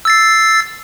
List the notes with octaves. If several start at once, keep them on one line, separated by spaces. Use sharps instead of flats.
E6 A6 C7